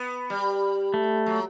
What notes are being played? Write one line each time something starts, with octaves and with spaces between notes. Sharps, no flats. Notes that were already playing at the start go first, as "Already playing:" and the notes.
Already playing: B3
G3
A3
F#3